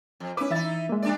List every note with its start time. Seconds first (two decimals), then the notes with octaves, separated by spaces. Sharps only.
0.20 F2
0.37 C#4 E4 B4 D6
0.50 E3 D#4 E4 E5 A6
0.89 G#3 A#3
1.02 G3 D4 D5